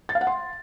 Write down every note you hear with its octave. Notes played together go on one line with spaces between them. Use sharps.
A6
F5
F#5
C6